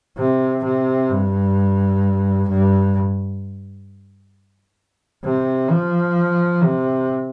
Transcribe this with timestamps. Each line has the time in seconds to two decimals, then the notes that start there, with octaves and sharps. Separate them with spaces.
0.18 C3
0.64 C3
1.10 G2
2.49 G2
5.25 C3
5.71 F3
6.63 C3